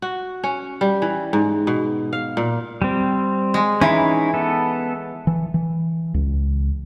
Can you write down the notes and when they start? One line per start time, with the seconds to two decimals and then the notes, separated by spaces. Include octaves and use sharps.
0.02 F#4
0.44 C#4
0.81 G3
1.02 E3
1.33 G#2
1.67 B2
2.13 F5
2.37 A#2
2.82 G3 C4
3.54 G#3
3.81 E3 C#4 D#4 E4
4.34 B3 A4
5.27 E3
5.54 E3
6.14 C#2